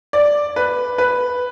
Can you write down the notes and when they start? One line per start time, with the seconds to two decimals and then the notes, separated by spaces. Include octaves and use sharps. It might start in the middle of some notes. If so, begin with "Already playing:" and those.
0.13 D5
0.56 B4
0.98 B4